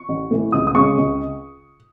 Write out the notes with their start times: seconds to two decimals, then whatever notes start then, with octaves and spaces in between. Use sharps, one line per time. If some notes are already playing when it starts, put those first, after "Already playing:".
Already playing: C#6
0.09 A1
0.31 A2 E3 A3
0.52 C#2 D#6
0.67 D#6
0.75 C#3 G#3 C#6
0.98 C#2